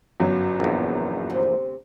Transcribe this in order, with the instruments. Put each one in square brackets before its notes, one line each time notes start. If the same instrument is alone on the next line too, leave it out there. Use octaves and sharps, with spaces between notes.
[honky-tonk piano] G1 F#2 F#3
[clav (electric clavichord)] A#1 E2
[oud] D2 C3